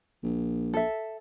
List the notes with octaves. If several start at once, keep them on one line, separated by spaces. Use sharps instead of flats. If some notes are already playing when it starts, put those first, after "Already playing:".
A#1
A4 E5